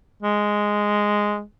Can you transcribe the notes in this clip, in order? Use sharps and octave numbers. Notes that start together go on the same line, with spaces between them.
G#3